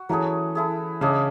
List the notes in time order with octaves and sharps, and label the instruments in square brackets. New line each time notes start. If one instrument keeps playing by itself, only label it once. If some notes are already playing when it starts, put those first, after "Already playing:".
Already playing: [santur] F#4
[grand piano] E3 [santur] F#3 A3 C#4 G#4
[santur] A3 E4 G#4
[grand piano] C#3 [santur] G#3 D4 G#4